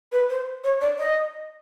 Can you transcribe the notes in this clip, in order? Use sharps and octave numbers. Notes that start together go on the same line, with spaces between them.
B4
C5
C#5
D5
D#5